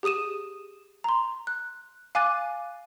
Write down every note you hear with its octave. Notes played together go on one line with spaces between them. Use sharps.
G4 G#4 D#6 D#7 E7
A#5 C6
F#6
F5 G#5 D6 F#6 A6 D#7